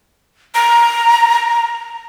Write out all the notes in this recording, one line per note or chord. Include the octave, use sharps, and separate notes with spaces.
A#5